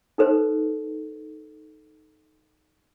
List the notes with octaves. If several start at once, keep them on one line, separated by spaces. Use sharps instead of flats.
D#4 A4 B4 C5